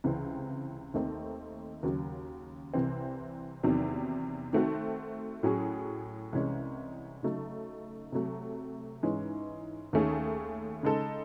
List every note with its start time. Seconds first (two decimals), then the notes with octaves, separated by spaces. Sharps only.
0.04 C#2 C3 E3 C4
0.94 D#2 D#3 A3 C4 D#4
1.83 D#2 C#3 F#3
2.74 C2 C3 E3 C4
3.63 E2 C3 D#3 F#3
4.53 D#3 A3 C4 F#4
5.43 A2 F#3 C#4 G#4
6.33 C2 C3 E3 G#3 C#4
7.23 C#3 F#3 A3 D#4
8.12 C3 F#3 A3
9.03 G#2 E3 G#3 C#4
9.93 D#2 D#3 A3 C#4 G#4
10.83 C#3 G#3 D#4 A4